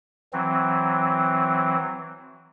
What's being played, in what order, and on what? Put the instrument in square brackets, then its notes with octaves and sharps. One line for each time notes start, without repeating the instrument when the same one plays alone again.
[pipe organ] E3 F#3 C4